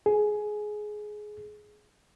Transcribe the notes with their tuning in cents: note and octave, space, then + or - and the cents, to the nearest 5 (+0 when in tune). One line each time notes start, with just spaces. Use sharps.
G#4 +15